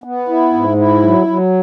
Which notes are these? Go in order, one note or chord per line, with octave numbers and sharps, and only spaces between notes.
B3
E4
G#2
E4
F#3
F#3